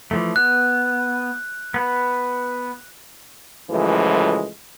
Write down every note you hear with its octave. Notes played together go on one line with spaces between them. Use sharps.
E3 F3 A3
B3 F#6
B3 B4
C#2 F#2 E3 F3 G#3 A3